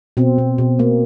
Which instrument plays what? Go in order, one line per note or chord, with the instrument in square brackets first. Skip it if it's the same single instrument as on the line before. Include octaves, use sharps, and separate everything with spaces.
[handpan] B2 C4
B2
B2
A#3